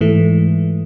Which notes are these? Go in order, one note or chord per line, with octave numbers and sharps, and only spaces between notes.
G#2 E3 A3